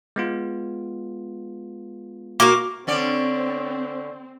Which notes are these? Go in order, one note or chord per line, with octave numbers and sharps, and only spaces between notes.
G#3 B3 F4
A#3 F#4 A#4 D6
D3 C4 C#4 D5